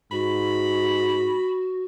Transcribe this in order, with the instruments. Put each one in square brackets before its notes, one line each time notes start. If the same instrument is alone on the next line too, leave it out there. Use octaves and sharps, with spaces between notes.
[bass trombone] G#2 [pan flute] F#4 [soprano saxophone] B5